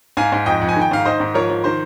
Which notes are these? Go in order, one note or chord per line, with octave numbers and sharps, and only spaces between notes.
G#2 F5 G#5
G#2
F2 D#5 G5
F2
G#5
D#3
G5
G#2 F5
D#3 C5 D#5
G#2
F3 A#4 C#5
F3
D#3 C5